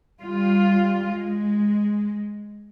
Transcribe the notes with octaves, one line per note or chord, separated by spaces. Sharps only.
G3 F4
G#3